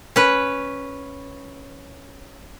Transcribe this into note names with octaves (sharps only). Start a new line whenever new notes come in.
C#4 B4